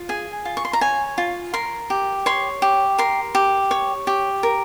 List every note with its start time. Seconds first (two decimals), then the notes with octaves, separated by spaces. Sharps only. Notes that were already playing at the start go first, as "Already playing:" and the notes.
Already playing: F4
0.09 G#4 G#5
0.45 F4
0.57 C#6
0.65 C6
0.73 A#5
0.81 C#5 G#5
1.18 F4
1.54 A#4 C6
1.90 G4
2.26 C#5 C6
2.62 G4
2.98 A#4 C6
3.35 G4
3.71 C#5
4.07 G4
4.43 A#4